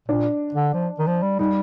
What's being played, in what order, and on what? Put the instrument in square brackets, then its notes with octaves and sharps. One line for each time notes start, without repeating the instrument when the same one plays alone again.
[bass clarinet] A#2 [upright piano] D4
[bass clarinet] D3
F3
D#3
F3
G3
[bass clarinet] G3 [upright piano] D#4